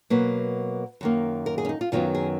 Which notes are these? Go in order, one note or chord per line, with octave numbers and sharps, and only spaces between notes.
B2 F#3 A#3 B4
F#2 D#3 A#3
A#4
G#4
C#4
D#4
F4
F#2 D#3 F#3 B3 F4
G#4